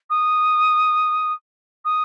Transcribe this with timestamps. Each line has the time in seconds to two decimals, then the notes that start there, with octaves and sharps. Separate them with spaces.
0.10 D#6
1.85 D#6